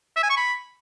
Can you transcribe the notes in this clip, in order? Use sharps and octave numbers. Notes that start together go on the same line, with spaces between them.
E5
G#5
C#6
B5